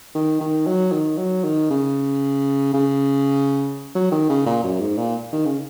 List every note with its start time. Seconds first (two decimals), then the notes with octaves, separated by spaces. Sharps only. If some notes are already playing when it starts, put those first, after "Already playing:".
0.15 D#3
0.41 D#3
0.67 F#3
0.92 D#3
1.18 F#3
1.44 D#3
1.70 C#3
2.73 C#3
3.95 F#3
4.12 D#3
4.29 C#3
4.46 A#2
4.63 F#2
4.80 G#2
4.98 A#2
5.32 D#3
5.45 C#3